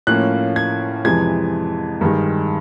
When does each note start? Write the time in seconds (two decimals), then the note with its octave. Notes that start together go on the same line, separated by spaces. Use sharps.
0.07 A2 F3 A#3 C#4 F#6
0.56 G#6
1.04 F2 C3 E3 G#3 G#6
2.01 G2 D#3 G#3